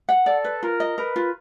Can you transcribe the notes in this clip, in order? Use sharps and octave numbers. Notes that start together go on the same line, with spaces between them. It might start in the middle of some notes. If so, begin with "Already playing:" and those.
F#5
A4 D5
B4
F4 A#4
D#5
A#4 B4
F4